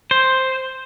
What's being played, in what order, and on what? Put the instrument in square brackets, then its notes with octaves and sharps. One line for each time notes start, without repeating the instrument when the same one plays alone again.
[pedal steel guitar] C5